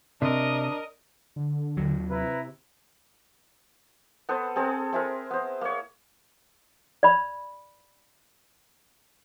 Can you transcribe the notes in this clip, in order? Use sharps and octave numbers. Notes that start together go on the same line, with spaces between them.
C3 D4 A#4 D#5
D3
D#2 F#3
C3 E4 B4 A#5
B3 A4 B4 C5
C4 G#4 A4
C4 E4 G#4 A#4
B3 C5
A#3 C#5
D5 B5